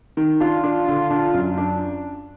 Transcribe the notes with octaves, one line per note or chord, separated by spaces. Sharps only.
D#3
D4 F4
D4
D3
D4
F#2
D4